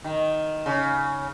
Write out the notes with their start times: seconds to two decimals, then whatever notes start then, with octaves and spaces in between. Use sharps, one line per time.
0.04 D#3
0.66 C#3